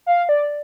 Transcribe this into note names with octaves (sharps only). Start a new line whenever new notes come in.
F5
D5